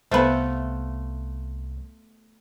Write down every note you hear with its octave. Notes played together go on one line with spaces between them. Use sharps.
C2 A3 B3 F4 B4 C5 E5 F#5